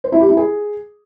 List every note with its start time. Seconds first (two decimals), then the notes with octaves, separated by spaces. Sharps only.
0.04 C5
0.12 E4
0.21 G4
0.29 E4
0.37 G#4